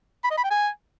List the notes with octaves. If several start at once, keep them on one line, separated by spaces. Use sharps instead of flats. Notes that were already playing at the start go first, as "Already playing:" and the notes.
B5
D#5
B5
G5
G#5